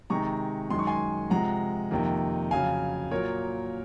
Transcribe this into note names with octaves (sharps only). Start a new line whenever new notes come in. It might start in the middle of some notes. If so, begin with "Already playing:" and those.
C3 D#3 G#3 A#5 C#6
F#2 D#3 G#3 C6
C#6
G#5 C6
C3 F3 G#3 F#5 A#5
F2 C3 D#3 A#3
F2 C#3 F#3 F5 G#5
A#2 F#3 A#3 A#4 C#5